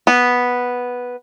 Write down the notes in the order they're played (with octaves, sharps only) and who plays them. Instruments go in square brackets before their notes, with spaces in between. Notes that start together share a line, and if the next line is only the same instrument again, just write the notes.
[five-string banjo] B3